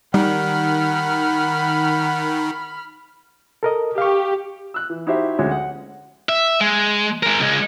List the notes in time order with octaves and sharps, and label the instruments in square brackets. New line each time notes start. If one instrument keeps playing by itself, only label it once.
[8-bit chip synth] D#3 [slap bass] G3 [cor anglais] F#5 [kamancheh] B5 F6
[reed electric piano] A4 A#4 D#5
[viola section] G4 [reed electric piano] F5 C#6
[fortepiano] E6 F#6
E3
D#4 E4 F#4 G4 C5 E5
D2 G#3 C#4 F#4 F#5
F#5
[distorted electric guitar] E5
G#3
G#3 A#4
C#2 G#3